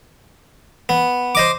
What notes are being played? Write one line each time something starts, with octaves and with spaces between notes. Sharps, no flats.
B3
C5 D#5 D6